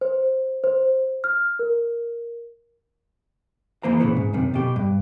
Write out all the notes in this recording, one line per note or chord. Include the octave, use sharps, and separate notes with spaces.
C5
C5
F6
A#4
E2 E3 A#3 C5 A#5
A#2 C#3 E3 B3
G#2
F#2 C3 D#3
B2 G4
G2